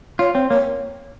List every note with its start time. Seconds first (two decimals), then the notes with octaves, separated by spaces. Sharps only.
0.19 F4 C#5
0.34 C4 C#5
0.50 A#3 C#5